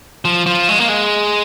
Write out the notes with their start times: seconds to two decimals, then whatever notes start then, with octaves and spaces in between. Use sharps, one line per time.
0.25 F3
0.46 F3
0.69 G#3
0.79 A#3
0.89 G#3